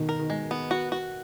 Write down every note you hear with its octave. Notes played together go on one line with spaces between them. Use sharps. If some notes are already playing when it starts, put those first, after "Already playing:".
Already playing: B2 D#3
A#4
D#3
G#3
B3
F#4
F#4